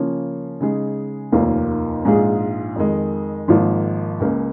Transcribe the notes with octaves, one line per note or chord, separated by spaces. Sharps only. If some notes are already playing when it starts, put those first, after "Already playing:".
Already playing: C#3 F3 A#3 C#4
C#3 G#3 D#4 G#4
F1 D#2 D#3 A#3 F4
A#1 G#2 G#3 F4 G#4
F2 D#3 G#3
G#1 G#2 F3 A#3
C#2 C#3 A#3